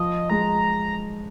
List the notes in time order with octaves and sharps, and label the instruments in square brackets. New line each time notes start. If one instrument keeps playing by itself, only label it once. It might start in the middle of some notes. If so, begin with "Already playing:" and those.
Already playing: [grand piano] F3 [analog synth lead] D#5
[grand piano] G#3 [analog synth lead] A#5